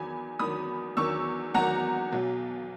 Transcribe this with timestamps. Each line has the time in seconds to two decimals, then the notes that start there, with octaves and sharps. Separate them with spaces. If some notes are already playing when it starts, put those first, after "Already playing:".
Already playing: E2 D#3 F#3 G#5 B5
0.39 E2 D#3 F#3 B5 D#6
0.97 E2 D#3 F#3 C#6 E6
1.54 E2 D#3 F#3 F#5 A#5
2.12 B1 B2 F#3